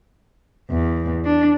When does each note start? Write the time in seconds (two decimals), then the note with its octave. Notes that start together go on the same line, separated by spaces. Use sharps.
0.70 E2
1.25 D4